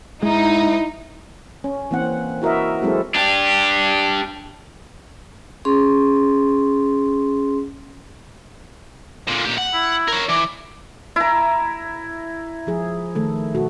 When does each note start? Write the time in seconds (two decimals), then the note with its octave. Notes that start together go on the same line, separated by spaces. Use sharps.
0.23 G#2 G#3 D#4 E4
1.64 C#4
1.91 E3 A#3 C4 F#5
2.42 E4 F#4 A#4 D#5 E5
2.82 F#3 G#3 C4 E4 A4
3.15 D4 G4
5.65 C#4 G#4 C6
9.28 A#2 D3
9.45 A#2 G4
9.58 F#5
9.73 E4
10.08 A#4 C#5
10.29 E3 D5
11.16 E4 A#5
12.67 F3 G#4
13.15 D#3 A3 A4
13.55 B2 F#4 A4